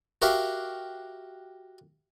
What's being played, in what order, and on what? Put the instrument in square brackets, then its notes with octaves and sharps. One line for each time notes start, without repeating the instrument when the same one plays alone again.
[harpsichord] F#4 G4 A#4 E5 F5